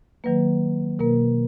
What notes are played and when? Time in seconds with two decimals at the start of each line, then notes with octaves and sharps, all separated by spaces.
0.24 D#3 F#3 A#3 B4
0.99 B2 A#3 A#4